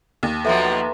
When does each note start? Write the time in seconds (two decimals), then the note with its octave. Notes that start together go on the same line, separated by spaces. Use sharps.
0.23 D#2
0.45 B2 F3 F#3 A4 B4 E5 A#5 C6